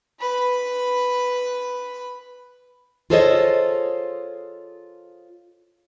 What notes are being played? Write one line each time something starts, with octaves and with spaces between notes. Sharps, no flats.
B4 B5
F4 G#4 A4 C5 C#5 D#5